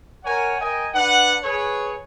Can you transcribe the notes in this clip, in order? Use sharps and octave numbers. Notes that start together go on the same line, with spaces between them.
A#4 C#5 F#5 G#5
A#4 D#5 G5 G#5
D4 B4 F#5
G#4 B4 C#5